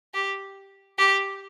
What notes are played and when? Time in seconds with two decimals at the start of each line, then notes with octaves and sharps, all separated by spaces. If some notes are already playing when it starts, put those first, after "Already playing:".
0.14 G4
0.98 G4